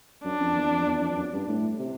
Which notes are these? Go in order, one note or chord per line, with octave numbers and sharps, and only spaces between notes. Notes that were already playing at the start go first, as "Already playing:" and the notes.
F#2 D4
F2
E2
F2
E2
F2
F#2
G2
A2
C3